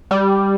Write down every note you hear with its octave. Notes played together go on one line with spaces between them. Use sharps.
G3